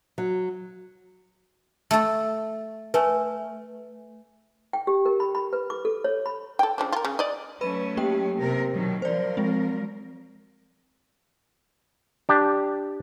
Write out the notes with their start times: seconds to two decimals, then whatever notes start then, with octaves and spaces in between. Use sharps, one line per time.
0.18 F#3
1.91 A3 A4
2.94 A3 B4 G#5
4.73 G5
4.87 G4
5.06 A#4
5.20 B5
5.35 B5
5.53 B4
5.70 D6
5.85 A4
6.04 C#5
6.26 B5
6.59 A4 G5
6.78 C#3 F3 D4
6.93 F4 A#4
7.05 C#3
7.19 D5 D#5
7.61 F#3 A3 C#4 B4 B5 D#7
7.97 A#3 G4 G5
8.38 C3 A#4
8.71 B2 D#3 F#3
9.02 F3 F#3 A#4 C5 D5
9.37 G#3 C4
12.29 D4 G4